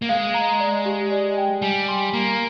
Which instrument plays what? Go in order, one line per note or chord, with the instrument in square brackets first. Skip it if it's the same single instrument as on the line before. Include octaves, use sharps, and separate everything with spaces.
[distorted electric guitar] A#3
[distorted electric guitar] G#3 [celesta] F5
[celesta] A#5
D5
G4
D5
G5
[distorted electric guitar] G3 [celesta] G#5
[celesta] C6
[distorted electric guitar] A#3 [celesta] A#5